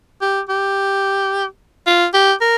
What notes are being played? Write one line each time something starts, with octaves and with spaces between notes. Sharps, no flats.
G4
G4
F4
G4
A#4